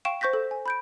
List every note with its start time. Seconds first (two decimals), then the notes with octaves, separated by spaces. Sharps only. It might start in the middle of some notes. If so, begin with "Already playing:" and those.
0.05 F5 G5 C#6 D7 E7
0.21 C5 C#6 G6 A#6 B6
0.33 A4
0.51 G#5
0.66 B5 G6 D7